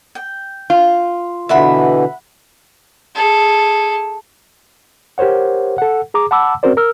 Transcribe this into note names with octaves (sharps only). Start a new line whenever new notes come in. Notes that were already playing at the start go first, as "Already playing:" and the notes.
G5
F4
B2 D3 E3 E5 F#5 B5
G#4 A4
G4 A#4 C5 C#5 F#5
A4 F#5
G#4 A#5 D6
F#5 A5 B5 D6 E6
C4 C#4 F#4 A#4 C5 D5
A#4 E6 F6